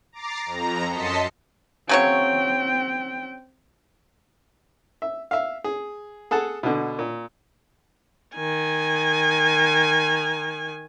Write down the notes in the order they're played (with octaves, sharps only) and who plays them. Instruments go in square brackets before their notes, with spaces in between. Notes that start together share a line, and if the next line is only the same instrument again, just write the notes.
[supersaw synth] A#5 D6 A6 C7
F2 A#5
F#2 D#5 A5 C6 B6 C#7
[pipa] C#3 F#3 C#5 [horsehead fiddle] C4 G5
[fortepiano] E5
E5 F5
G#4
G#4 A4 F#5 A5
B2 D3
A#2
[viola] D#3 G#5